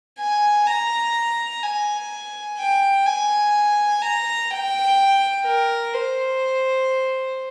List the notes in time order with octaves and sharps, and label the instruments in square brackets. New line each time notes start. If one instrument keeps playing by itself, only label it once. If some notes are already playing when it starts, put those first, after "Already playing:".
[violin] G#5
A#5
G#5
G5
G#5
A#5
G5
A#4
C5